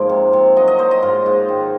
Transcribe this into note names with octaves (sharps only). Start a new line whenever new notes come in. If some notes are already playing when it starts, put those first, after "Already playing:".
Already playing: G#2 F3 A#3
C3
C3
F#3 D#5
D#5
A#3 C5
D#5
G#2 F4
G#2
D#3